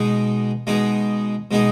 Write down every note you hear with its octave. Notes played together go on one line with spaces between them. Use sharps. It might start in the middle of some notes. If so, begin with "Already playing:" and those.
Already playing: B2 G#3 B3 D#4 G#4
B2 G#3 B3 D#4 G#4
B2 G#3 B3 D#4 G#4